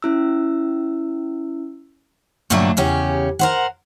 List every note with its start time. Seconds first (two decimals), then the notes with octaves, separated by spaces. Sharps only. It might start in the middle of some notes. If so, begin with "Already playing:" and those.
0.02 C#4 E4 E6
2.50 G2 A#2 D3 F#3 A3 D4
2.77 E2 C#3 C#4 G4
3.39 A#4 C5 F#5